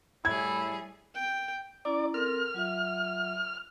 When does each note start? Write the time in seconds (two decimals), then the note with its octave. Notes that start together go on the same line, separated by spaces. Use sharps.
0.25 A2 G3 E4 G#4 G#6
1.15 G5
1.85 C#4 E4 D5 A#5
2.14 C4 A4 A#4 F6
2.54 F#3 F4 E5